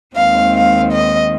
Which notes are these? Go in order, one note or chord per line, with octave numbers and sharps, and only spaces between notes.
D#2 D#3 G#3 C4 F5
F5
D#5